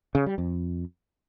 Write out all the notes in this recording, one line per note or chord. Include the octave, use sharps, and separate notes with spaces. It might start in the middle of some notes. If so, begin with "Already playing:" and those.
C#3
G3
F2